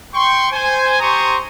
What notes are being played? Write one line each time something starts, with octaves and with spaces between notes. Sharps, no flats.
G5 C6 C#6
C5 G#5
G4 C5 A#5 C6 C#6 D#6